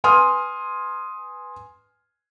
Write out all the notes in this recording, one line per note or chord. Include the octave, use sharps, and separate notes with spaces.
B4 G#5 C6 D#6 F6